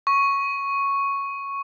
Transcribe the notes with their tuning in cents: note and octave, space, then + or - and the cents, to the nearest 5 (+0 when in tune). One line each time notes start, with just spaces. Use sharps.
C#6 +0